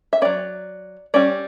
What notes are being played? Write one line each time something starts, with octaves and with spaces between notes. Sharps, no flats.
E5
F#3 C#4 D5
G3 C#4 D5